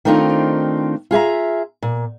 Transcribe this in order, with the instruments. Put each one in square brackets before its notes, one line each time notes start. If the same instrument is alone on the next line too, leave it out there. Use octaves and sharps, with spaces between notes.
[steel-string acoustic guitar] D#3 A3 C4 D4 D#4 F4
F4 G#4 E5 A#5
A#2